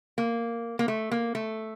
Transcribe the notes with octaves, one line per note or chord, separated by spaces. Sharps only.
A#3
A#3
A3
A#3
A3